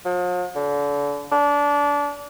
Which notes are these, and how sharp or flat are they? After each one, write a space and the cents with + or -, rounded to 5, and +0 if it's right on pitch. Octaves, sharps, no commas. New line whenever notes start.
F3 +45
D3 -35
D4 -25